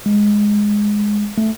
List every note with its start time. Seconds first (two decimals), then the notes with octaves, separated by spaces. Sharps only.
0.06 G#3
1.38 A3